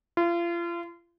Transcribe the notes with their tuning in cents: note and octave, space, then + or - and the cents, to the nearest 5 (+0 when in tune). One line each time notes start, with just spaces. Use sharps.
F4 -35